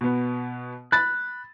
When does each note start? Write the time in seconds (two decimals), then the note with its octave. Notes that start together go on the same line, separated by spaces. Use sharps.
0.01 B2 B3
0.92 B5 F#6 A6